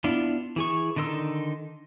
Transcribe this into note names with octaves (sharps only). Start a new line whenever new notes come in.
B3 D4 E4 F4
E3 G#4 C#6
D3 D#3 D#4 C6 E6